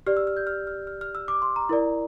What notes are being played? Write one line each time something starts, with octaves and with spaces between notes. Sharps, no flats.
G4 D5 F6
E6
F6
G6
F6
F6
F6
F6
E6
D6
C6
A#5
E4 A#4 D5